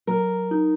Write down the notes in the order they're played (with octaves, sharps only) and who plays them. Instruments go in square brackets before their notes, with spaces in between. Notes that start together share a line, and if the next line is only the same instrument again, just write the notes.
[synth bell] F#3 [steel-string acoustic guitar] A#4
[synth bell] D#4